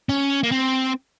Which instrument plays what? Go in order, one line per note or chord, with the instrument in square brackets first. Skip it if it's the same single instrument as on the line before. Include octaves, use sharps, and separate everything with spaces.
[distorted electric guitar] C#4
A#3
C4